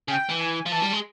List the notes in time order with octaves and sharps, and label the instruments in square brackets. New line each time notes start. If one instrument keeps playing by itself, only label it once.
[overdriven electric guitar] C#3 [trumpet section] G5
[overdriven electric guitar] E3
[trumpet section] G#5
[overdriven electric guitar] F3
[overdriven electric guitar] E3 [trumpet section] A5
[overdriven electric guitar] G3
G#3